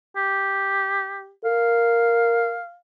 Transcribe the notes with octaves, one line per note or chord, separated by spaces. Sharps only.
G4
A#4 F5